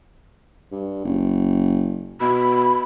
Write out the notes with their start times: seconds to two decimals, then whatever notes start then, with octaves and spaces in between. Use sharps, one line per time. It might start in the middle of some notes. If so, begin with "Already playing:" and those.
0.72 G2
1.05 F#1
2.21 B2 B5